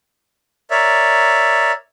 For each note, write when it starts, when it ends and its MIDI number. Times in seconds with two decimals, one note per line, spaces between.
0.71 1.72 70
0.71 1.72 73
0.71 1.72 74
0.71 1.72 76